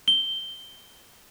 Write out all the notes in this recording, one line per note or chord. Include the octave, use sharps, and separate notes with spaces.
G7